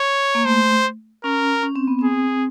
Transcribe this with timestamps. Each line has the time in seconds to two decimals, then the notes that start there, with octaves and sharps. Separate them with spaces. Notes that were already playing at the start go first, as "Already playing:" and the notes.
Already playing: C#5
0.35 A#3
0.45 A3 C5
1.24 C#4 A#4
1.63 C#4
1.76 C4
1.88 B3
1.99 C4 G#4